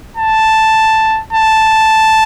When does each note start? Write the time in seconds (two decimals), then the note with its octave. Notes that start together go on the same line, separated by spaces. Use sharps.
0.17 A5
1.33 A5